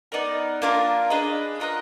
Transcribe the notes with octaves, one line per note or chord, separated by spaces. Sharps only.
B3 D#4 A#4 D5
A#3 D4 F4 A#4
D4 G#4 B4 D#5
F4 A#4 D#5 F#5